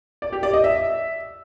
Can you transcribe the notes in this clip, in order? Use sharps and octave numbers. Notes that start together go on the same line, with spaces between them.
D5
G4
D5
D#5
E5